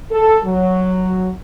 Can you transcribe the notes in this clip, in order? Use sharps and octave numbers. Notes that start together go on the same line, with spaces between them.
A4
F#3